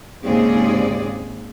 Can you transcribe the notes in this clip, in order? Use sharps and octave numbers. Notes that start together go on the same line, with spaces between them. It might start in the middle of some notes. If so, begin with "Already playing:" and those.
D#2 G#2 C#3 C4 G#4 D5